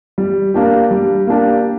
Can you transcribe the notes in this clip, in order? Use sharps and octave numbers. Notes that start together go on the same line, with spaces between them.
G3
A#3 D4 G4
G3
A#3 D4 G4